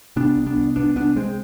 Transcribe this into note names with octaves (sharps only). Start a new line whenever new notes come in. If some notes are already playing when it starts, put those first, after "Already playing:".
C3 B3 D4
C2
B3 D4
C2
C2 B3 D4
C2 B3 D4
C2 G#3 C4